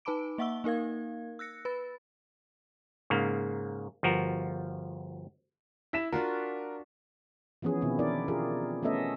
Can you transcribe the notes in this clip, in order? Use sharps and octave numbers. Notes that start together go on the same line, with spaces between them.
D#4 B4 A5 B5 D6 D7
A#3 E5 F#5 C#6 E6 G7
A#3 D#4 A#4 F5 G#6
E6 F#6 A#6 C#7
B4 B5 A6
G#2 C#3 A#3
G1 F3 F#4 A#4
E4 B6 E7
D4 F4 F#4 A#4
E3 F3 B3 C#4 G#4
B2 D#3 B3 C4 E4
D4 E4 A#4 D5
F4 G4 G#4 A#4
A3 B3 C#4 A4 D#5 E5